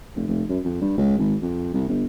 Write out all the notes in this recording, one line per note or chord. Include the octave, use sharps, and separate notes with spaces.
F1
F1
F#2
F2
G2
C#2
G#1
F2
C2
G1